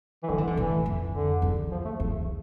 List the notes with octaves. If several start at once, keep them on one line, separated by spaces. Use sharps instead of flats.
E3
D3 F3
E3
D3
A2 E3
F2
D3
E2
F3
A3
E2